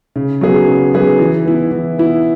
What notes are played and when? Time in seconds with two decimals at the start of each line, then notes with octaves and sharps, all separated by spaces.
0.16 C#3
0.41 F#3 B3 G#4 B4
0.68 C#3
0.94 F#3 B3 G#4 B4
1.20 E3
1.45 B3 E4
1.71 E3
1.98 B3 E4